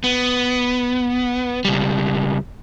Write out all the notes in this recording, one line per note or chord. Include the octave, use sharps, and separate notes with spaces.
B3
C#2 G3